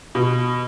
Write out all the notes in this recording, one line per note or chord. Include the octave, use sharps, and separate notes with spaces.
B2